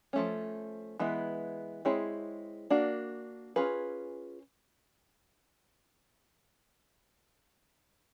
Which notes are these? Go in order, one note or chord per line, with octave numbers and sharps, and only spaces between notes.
F3 A3 C#4
E3 G#3 B3 E4
G#3 C4 E4 G#4 C#5
A#3 D4 F#4
C#4 F4 G#4 B4